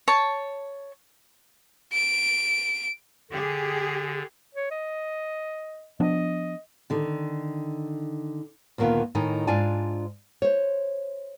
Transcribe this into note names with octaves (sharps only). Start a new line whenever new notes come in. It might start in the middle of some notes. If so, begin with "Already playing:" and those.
C#5 A5
D7
D3 G4 G#4
C#5
D#5
F3 B3 D4 D#5
D3 D#3
D2 A#2 D#3 A#3 B3 F4
A2 D#3 D#4 G#5
G#2 D4 F4 D5 G#5 A5
C5 C#5